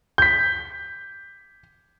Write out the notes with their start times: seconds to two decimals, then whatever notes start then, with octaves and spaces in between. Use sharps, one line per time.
0.18 G6 B6